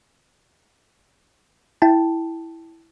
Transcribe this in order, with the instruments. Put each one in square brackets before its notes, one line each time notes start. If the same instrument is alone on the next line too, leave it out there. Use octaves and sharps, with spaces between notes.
[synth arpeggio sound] E4 G5 A5